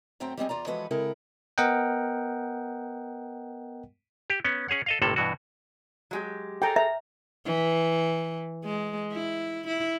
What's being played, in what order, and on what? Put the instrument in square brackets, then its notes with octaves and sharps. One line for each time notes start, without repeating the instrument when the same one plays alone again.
[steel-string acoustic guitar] F#2 A3 C4 C5 G5 A#5
G3 G#3 C4 G#4
E2 F4 D5 A#5
E3 F3 G#3 F#4 A4 B4
C#3 G#3 C4 E4 A4 A#4
[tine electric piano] B3 A#4 D#5 F#5 G5
[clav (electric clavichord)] G4
B3 C#4
C#4 G#4 C#5 F#5
A4 D#5 F5
G1 A2 C3 A#3 A4
G2 B2 E3 F#4
[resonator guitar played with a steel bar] F#3 G#3 G4
[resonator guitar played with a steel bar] G#4 A4 [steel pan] G5 A#5
[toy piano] E5 [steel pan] A#5
[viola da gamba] E3
G#3
E4
E4